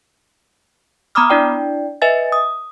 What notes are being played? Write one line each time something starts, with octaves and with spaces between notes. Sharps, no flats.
B3 A#5 B5 D6 D#6 F6
D4 E4 D5 G5
B4 D#5 E5 G#5 A6
D#6